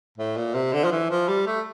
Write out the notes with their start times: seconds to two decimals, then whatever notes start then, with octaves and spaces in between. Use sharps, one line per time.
0.18 A2
0.37 A#2
0.54 C3
0.73 D3
0.84 F3
0.92 E3
1.10 F3
1.28 G3
1.47 A3